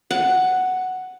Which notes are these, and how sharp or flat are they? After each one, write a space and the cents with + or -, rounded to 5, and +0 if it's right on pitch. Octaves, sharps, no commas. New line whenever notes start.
F#5 +5